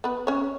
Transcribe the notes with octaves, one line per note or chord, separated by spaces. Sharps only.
B3 B4
C#4 C#5